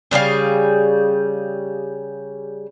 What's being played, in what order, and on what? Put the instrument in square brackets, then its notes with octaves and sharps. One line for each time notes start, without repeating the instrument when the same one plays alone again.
[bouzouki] C#3 G3 G#4 F5